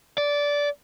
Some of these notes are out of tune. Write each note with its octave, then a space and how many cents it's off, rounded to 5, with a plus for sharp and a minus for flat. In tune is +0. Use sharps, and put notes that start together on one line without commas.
D5 -15